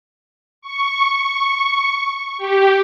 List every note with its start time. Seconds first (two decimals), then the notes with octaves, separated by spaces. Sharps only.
0.62 C#6
2.38 G4